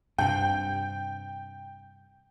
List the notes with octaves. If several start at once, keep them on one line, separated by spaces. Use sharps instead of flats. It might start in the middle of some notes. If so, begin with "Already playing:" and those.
G2 C3 G5